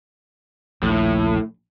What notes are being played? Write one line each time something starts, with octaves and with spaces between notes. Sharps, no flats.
A#1 D#2 A2